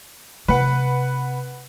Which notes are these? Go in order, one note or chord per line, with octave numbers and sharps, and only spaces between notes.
C3 B4 F#5